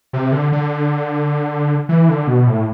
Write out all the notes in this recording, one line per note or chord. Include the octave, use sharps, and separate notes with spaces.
C3
D3
D3
E3
D3
B2
A2